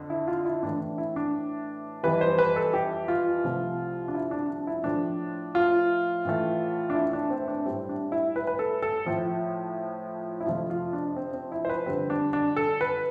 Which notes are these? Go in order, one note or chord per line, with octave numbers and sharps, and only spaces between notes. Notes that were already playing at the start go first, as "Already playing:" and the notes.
Already playing: F2 D3
E4
F4
E4
A2 E3 A3 D4
D4
E4
D4
F2 E3 G3 B4
C5
B4
A4
G4
F4
C2 C3 F3 A3
D4
E4
D4
D4
E4
A2 F3 A3 D4
F4
A2 E3 A3
D4
E4
D4
C4
D4
A2 G3 C4
D4
E4
B4
B4
A4
A4
A2 F3 A3
E4
F2 C3 F3 A3 F4
F4
D4
C4
C4
E4
C5
B4
F2 D3 G3 C4
D4
D4
A4
B4